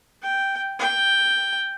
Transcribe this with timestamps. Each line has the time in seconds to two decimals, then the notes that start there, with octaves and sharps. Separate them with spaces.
0.22 G5
0.79 G5